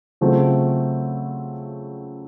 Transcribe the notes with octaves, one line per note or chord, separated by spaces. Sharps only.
C#3 F#3 A3 C4 F4